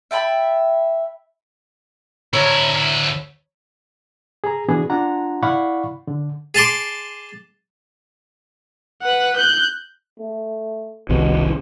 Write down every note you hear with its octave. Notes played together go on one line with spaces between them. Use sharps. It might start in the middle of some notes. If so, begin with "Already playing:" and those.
E5 G5 A5 B5
D2 E4 C#5 A#5
G#4 A#5
E3 B3 D4 F#4 G#4
D4 F4 F#5 A#5
E4 D5 F5 F#5 B5 C#6
D3
G#4 A5 C6 D6
B4 F#5
F#6 G6
A3
F1 C2 B2 D#3